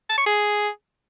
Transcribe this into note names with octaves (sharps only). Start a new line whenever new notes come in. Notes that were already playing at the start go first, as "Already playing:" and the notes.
A5
C#6
G#4